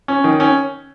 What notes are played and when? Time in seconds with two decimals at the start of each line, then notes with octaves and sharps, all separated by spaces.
0.08 C#4
0.24 D#3
0.40 C#4